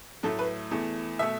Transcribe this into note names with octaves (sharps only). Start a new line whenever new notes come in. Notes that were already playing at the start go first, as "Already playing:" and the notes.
A2 F#3 A3 A4
B4
E2 E3 A3
B2 A3 E5